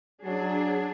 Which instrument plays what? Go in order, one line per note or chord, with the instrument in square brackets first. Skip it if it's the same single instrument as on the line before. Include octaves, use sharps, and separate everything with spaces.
[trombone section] F#3 [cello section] D4 G#4